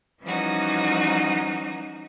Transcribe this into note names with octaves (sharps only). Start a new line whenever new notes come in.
E3 F3 G3 C#4 D#4 F#4